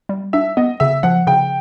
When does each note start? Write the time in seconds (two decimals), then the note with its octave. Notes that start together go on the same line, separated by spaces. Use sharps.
0.09 G3
0.33 D4 E5
0.57 B3 D#5
0.80 C#3 E5
1.03 F3 F#5
1.27 C#3 G5